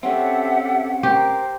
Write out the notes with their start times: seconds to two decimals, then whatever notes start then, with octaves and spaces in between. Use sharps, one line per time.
0.03 C4 C#4 G4 A4 E5 F#5
1.03 G4 A#4 C5